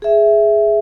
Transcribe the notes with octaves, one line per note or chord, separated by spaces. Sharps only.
G#4 E5